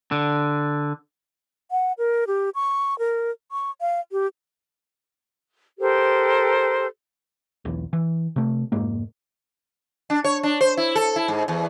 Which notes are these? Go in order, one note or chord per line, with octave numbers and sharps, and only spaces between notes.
D3
F#5
A#4
G4
C#6
A#4
C#6
F5
G4
G4 A4 A#4 C5
B1 E2
E3
C3 A3
F1 G#2 G#3 A#3
D4
C#5
D4
C5
E4
A4
E4
G#2
E2